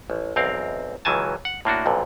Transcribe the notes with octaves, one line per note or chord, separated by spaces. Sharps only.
A1
B1 E2 C4 A#4 F5
C#2 D#3 E3 F#3 G#5 A5
F#5
A2 A#3 D4 F#4
B1 F2 A#2 D3